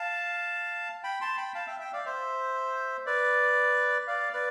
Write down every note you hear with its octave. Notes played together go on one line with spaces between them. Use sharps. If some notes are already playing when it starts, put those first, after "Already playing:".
Already playing: F5 A5
G5 B5
A5 C6
G5 B5
F5 A5
E5 G5
E5 G5
D5 F5
C5 E5
B4 D5
D5 F5
B4 D5